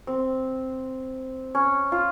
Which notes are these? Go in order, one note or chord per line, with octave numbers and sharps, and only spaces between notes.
C4
C#4
F4